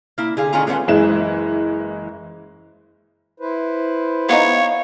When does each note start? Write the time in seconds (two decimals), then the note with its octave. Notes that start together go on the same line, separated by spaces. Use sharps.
0.18 A#3 E4
0.37 D3 G#4 F5
0.53 D#3 A3 C#4 F4 G#4 A#5
0.67 G#3 A3 B3 C#4 F#5
0.88 F#1 E3 G#3 E5 E7
3.40 E4 B4 C5
4.29 B3 D#4 C#5 F5